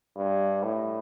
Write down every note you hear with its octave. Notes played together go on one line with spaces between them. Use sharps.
G2
A2